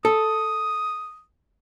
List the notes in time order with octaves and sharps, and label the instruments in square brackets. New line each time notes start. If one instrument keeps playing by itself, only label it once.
[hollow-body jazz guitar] A4 [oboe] D#6